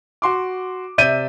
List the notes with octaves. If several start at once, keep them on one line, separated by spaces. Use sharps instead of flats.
F#4 C6 D6
C3 D5 E5 G6 D#7